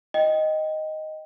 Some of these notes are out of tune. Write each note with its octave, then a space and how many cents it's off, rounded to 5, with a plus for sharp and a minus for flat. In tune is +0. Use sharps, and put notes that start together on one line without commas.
D#5 +0 G5 +0